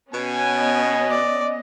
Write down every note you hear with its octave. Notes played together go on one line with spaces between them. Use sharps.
B2 B3 C#4 G#5
D#5
D5